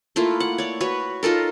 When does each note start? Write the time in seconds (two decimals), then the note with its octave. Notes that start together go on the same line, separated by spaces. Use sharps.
0.16 A3 A#3 E4 F4
0.40 F#5
0.58 C#5 D5
0.81 F#4 B4 C#5
1.23 D#4 F4 A4 A#4